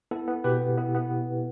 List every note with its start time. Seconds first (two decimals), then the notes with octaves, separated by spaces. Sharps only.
0.11 B3 E4 A4
0.27 B3
0.44 B2 G4 B4
0.60 B3
0.77 B3 E4
0.95 B3